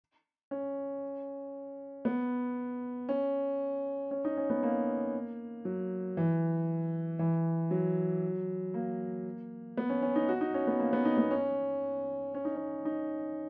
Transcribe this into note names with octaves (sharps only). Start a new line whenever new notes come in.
C#4
B3
C#4
C#4
D#4
C#4
B3
A#3
F#3
E3
E3
F#3
A#3
B3
C#4
C#4
D#4
F#4
D#4
C#4
B3
A#3
B3
D#4
B3
C#4
C#4
D#4
C#4
D#4